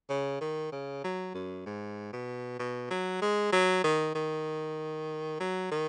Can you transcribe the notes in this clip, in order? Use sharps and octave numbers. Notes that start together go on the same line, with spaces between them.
C#3
D#3
C#3
F#3
F#2
G#2
B2
B2
F#3
G#3
F#3
D#3
D#3
F#3
D#3